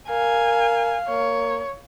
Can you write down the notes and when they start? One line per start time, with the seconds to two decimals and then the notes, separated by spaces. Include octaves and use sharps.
0.10 A#4 F5 G#5
1.09 A#3 C#5